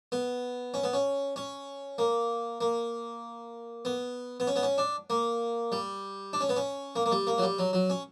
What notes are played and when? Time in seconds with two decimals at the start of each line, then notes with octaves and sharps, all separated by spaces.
0.12 B3
0.74 C#4
0.84 B3
0.93 C#4
1.36 C#4
1.98 A#3
2.61 A#3
3.85 B3
4.40 B3
4.47 C#4
4.56 B3
4.63 C#4
4.78 D4
5.10 A#3
5.72 G3
6.33 D4
6.41 C#4
6.49 B3
6.56 C#4
6.96 A#3
7.06 A#3
7.11 G3
7.27 A#3
7.38 F#3
7.42 G3
7.59 F#3
7.73 F#3
7.90 C#4